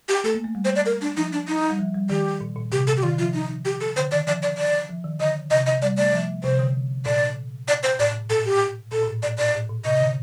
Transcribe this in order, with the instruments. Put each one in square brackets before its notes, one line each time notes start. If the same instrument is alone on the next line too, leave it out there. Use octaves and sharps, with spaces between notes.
[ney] G4
[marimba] A3 [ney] A4
[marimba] A#3
A3
G3
[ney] C5
D5
A#4
D4
[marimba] F3 [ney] D#4
[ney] D4
D#4
[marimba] G3
F3
G3
[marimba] D#3 [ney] G4
[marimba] A#2
A#2
[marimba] C3 [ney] G4
[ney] A4
G4
[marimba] D#3 [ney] F4
[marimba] F3 [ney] F4
[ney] D#4
G4
A4
[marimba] D3 [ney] C5
[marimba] D#3 [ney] D5
[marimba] F3 [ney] D5
[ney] D5
D5
[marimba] F3
D#3
[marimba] D3 [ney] D#5
[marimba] C3 [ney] D#5
[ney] D#5
[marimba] G3 [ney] D5
[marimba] A3 [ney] D5
[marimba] F3
[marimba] C3 [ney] C5
[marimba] D3
[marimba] A#2 [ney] D5
[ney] D5
C5
[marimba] A2 [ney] D5
[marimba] A#2 [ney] A4
[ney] G4
[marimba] A#2 [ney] A4
[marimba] A#2
A2
[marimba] A#2 [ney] D5
[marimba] A#2 [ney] D5
[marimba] A2
A#2
[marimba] C3 [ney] D#5
[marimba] D3